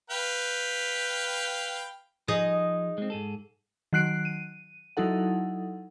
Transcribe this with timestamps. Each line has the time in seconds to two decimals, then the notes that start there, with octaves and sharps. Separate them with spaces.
0.10 B4 F5 G5
2.28 F3 D#4 G#4 D#5
2.98 G#3 C4
3.10 G#2 G#4 A4
3.93 D#3 F#3 F#6 C7 D7
4.25 D#7
4.97 F#3 D#4 E4 A4 F#5